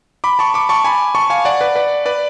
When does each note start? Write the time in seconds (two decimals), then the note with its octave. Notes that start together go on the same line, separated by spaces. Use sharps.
0.24 B5 D6
0.39 A5 C#6
0.54 B5 D6
0.69 A5 C#6
0.85 G#5 B5
1.15 A5 C#6
1.30 F5 G#5
1.45 D5 F#5
1.61 B4 D5
1.76 B4 D5
2.06 B4 D5